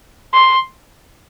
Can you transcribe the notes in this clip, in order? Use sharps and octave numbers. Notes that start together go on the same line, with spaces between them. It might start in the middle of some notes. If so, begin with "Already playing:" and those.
C6